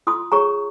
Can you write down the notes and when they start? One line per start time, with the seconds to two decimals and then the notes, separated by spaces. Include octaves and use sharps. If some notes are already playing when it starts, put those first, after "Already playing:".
0.07 F4 C6 D#6
0.32 G#4 C#5 A#5 C#6